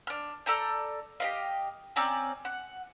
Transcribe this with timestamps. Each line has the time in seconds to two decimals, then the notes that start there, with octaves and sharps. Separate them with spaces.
0.07 D4 F6
0.46 A4 D5 A#5 G6
1.20 G4 D#5 F5
1.96 C4 C#4 D5 A#5
2.45 F#5